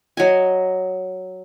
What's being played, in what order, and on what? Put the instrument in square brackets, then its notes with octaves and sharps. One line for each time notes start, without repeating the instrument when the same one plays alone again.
[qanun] F#3 D#5 G#5